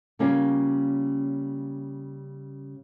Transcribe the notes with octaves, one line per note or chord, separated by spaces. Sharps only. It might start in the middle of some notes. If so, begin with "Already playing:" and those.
C#3 G3 A#3 C#4 F4